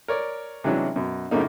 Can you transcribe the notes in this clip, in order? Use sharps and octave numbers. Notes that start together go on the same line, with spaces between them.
A#4 C#5 D5
C3 E3 F#3 G#3 C#4 D4
F#2 B2
F#2 A2 C#3 A#3 D#4